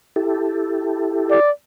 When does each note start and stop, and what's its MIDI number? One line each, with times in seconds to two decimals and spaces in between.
0.16 1.40 64
0.16 1.40 67
0.16 1.40 69
1.30 1.51 74